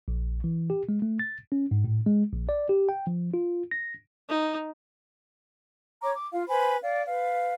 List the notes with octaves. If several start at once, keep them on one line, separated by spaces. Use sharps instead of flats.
A#1
E3
G4
G#3
A3
A6
C#4
G#2
A2
G#3
A#1
D5
G4
G5
F3
F4
A#6
D#4
C#5 A#5 D6
D6
F4 F5
B4 C5 G#5 B5
D5 F5
B4 F5